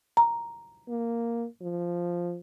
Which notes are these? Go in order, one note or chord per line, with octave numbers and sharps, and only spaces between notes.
A#5
A#3
F3